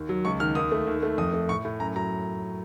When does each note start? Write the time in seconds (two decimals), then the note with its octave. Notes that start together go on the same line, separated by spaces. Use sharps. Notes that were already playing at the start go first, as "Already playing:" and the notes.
Already playing: D#2
0.09 F#3
0.25 C#2 C#6
0.40 D#3 F6
0.55 D#2 D#6
0.72 A3
0.87 D#2
1.03 A3
1.18 F2 D#6
1.33 A3
1.49 A2 C#6
1.65 A2
1.80 F#2 A#5
1.95 F#3 A#5